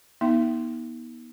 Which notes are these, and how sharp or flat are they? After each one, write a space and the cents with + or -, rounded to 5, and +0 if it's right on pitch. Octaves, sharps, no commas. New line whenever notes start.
B3 -35 D#4 +35 E5 +40